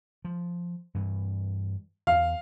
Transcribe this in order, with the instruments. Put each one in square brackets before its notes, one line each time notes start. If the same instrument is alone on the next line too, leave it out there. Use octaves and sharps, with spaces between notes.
[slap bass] F3
G2 E3
[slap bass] E2 [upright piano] F5